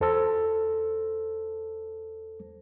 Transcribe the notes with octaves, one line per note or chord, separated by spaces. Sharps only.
E2 A4 C5 A5 E6